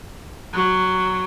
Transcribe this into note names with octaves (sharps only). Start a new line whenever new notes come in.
F#3